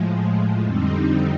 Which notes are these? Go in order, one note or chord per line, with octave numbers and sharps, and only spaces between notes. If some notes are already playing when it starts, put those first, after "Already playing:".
Already playing: A2 F3 G#3
F2 D3 G3 C4 D#4